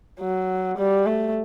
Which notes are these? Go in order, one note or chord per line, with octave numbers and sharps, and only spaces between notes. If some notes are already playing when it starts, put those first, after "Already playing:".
F#3
G3
A3